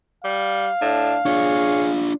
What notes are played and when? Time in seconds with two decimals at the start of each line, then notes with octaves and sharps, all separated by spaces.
0.24 G3 F5
0.81 A2 D4
1.26 D4 F4 G#4 C#5